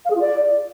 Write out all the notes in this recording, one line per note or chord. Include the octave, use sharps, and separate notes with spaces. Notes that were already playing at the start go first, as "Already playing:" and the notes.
F5
G#4
F4
D5